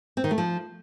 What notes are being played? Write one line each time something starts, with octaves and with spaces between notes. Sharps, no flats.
C4
D#3
A3
F3